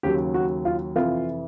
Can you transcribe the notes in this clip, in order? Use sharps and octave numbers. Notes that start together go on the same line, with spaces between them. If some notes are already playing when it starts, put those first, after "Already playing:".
D#2 C#3 F#3 G4
F#4
F4
F2 C3 E3 F4